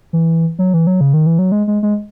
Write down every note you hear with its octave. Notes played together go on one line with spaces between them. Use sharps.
E3
F#3
E3
F#3
C#3
D#3
E3
F#3
G#3
G#3
G#3